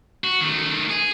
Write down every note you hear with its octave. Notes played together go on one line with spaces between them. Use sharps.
F#4
D#3 A3
G#4